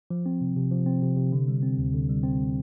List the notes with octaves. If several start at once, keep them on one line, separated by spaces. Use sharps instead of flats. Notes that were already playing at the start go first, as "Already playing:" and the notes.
F3
C4
C3
C3
F3
C4
C3
C3
D3
G3
C4
D2
D3
G3
C4